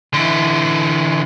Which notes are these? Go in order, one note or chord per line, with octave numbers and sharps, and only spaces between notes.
D3 E3